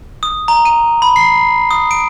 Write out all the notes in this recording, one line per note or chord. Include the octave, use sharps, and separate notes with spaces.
D#6
A#5
D#7
B5
C7
D#6
D7